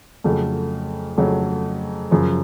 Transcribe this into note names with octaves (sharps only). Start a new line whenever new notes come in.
F2 C#3 F#3 A3
F2 C#3 F#3 A3
F#2 C#3 F3